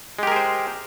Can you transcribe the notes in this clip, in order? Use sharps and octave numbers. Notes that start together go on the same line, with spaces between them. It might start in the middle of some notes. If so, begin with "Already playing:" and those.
G#3 G4 G#4 A#4 C5